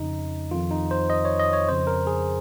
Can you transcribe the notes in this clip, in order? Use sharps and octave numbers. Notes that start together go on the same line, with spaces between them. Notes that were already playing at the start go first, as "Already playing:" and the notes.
Already playing: F2 C#3 D#4
F2 D#3 F4
D#4
C5
D#5
C#5
D#5
C#5
F2 C#3 C5
A#4
G#4